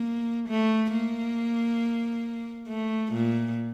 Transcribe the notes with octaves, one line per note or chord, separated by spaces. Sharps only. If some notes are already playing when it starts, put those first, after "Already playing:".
Already playing: A#3
A3
A#3
A3
A#2